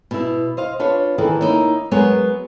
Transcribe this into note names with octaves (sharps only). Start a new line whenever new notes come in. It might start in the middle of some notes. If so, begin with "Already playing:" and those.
B2 E4
C5 D#5 F5
D4 F4 B4 C#5
D#3 E3 G#4 A4 D#5
A#3 D#4 E4 C#5
F#3 G#3 B3 G#4 A#4 C#5